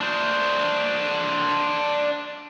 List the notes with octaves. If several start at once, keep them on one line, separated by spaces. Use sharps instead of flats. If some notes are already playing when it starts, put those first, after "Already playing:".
D4 C5